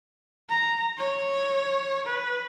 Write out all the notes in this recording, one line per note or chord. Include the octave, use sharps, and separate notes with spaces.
A#5
C#5
B4